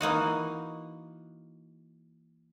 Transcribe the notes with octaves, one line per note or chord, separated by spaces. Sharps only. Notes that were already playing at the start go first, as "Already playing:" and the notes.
E3 A#3 D#4 F#4